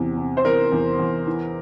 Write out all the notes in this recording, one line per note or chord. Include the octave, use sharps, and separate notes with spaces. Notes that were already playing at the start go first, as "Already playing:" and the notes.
Already playing: E2 C3
C3
C5
E2 A#4
E2
E2
E3